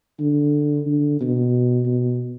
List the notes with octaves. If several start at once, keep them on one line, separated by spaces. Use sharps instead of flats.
D3
D3
B2
B2